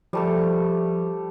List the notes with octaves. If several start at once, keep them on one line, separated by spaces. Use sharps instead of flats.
F3 G3 A3 A4